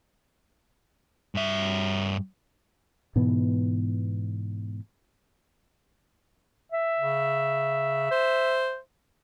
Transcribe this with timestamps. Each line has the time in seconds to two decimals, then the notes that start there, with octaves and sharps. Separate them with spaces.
1.35 G2 E5
3.16 G#2 B2 E3 B3
6.72 E5
6.99 C#3
8.11 C5